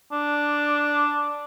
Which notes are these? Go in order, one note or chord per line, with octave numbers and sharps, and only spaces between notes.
D4